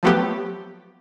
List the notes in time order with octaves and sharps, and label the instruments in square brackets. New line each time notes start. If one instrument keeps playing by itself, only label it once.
[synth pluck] F3 F#3 A3 B3 G4